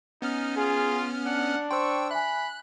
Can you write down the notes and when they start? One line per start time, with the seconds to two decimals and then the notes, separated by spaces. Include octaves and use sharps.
0.22 B3 C#4 D#4 F6
0.57 F4 G#4
1.26 D4 F#5
1.71 C5 G5 C6 C#6 E6
2.11 E5 G#5 B5 F#6